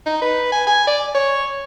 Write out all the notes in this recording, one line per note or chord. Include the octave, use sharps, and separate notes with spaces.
D#4
B4
G#5
G#5
D5
C#5